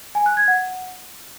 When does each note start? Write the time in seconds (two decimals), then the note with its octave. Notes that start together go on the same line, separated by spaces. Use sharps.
0.15 G#5
0.26 F#6
0.37 G#6
0.48 F#5